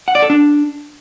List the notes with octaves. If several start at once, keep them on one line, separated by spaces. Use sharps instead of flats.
F#5
D5
A4
D4